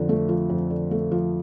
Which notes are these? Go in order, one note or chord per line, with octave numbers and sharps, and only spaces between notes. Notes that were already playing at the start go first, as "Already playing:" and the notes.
Already playing: F2 D3 F3
A3
F3
F2
D3
A3
F3